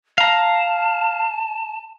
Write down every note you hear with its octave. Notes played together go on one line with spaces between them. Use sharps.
F5 A5 A#5